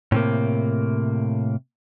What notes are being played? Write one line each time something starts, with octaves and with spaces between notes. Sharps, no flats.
A2 C3 A#3